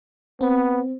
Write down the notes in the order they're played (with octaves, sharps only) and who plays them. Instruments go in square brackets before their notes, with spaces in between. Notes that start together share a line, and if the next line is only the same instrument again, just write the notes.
[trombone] B3 [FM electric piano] C4